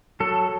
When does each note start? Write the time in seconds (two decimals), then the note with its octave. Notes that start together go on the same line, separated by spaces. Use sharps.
0.20 F#3 A4